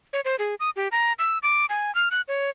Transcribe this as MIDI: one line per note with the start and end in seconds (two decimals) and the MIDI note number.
0.13 0.21 73
0.25 0.36 72
0.39 0.55 68
0.60 0.70 87
0.76 0.88 67
0.92 1.13 82
1.19 1.38 88
1.43 1.66 86
1.69 1.94 80
1.95 2.09 89
2.11 2.21 90
2.28 2.50 73